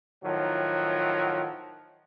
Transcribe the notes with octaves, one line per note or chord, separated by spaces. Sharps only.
A2 D#3 F3 F#3